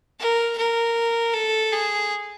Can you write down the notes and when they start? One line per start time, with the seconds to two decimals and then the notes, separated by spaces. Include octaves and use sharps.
0.19 A#4
0.58 A#4
1.34 A4
1.73 G#4